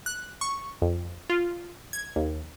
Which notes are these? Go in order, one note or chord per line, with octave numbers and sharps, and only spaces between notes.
F#6
C#6
F2
F4
G#6
D#2